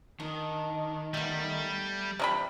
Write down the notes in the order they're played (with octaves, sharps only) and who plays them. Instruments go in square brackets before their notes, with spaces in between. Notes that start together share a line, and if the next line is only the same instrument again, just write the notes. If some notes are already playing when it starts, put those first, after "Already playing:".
[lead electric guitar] D#3 [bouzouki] D4
[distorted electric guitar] G3 [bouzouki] A3 B3
[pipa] C3 G3 B5 [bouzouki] E3 F4